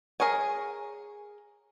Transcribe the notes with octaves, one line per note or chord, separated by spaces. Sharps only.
G#4 A#4 C#5 G#5